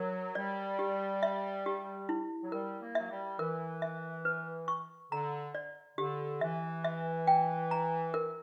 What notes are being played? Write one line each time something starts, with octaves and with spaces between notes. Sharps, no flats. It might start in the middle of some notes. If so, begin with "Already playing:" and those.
Already playing: F#3 A#4
G3 D5
G4
E5
G4
E4
F#3
G3 A#4
A#3
F#3 E5
G3
E3 A#4
E5
B4
C#6
D3 A#5
D5
D3 G4
E3 E5
E5
G5
A#5
A#4